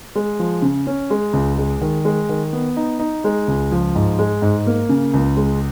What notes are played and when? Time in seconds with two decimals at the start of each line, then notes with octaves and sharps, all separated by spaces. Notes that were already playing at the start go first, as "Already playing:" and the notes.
0.15 G#3
0.39 F3
0.62 C#3
0.87 C#4
1.10 G#3
1.33 C#2
1.58 G#3
1.81 D#3
2.05 G#3
2.29 D#3
2.53 B3
2.77 D#4
2.99 D#4
3.24 G#3
3.48 C#2
3.72 F3
3.95 G#2
4.19 G#3
4.42 G#2
4.67 A#3
4.89 C#3
5.14 C#2
5.37 G#3